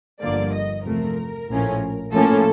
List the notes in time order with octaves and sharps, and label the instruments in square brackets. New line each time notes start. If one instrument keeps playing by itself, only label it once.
[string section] G1 G2 D3 F3 A#3 D5
D#5
E2 C3 F3 A3 A#4
A#1 A2 F3 A3 C#4
A2 F3 A#3 C#4 A4